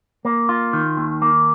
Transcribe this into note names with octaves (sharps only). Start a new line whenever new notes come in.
A#3
F4
D#3
D#2
A#3